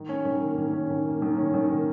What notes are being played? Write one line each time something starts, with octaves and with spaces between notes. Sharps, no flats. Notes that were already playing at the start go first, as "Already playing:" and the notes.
Already playing: D#3
C#4
D#3
A#3
D#3
C#4
D#3
A#3
D#3
C#4
D#3
A#3